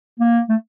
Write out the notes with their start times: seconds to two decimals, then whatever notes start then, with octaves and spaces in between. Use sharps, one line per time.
0.20 A#3
0.49 A3